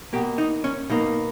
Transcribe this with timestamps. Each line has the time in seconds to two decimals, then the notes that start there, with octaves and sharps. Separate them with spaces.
0.13 B2 A#3 G4
0.38 D#4
0.64 C#4
0.90 B2 A#3 D#4